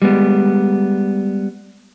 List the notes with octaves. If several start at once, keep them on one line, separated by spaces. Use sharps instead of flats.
G3 G#3 B3